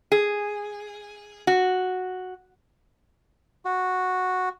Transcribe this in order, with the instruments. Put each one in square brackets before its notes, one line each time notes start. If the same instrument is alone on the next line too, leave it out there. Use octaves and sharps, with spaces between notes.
[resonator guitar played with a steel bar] G#4
F#4
[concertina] F#4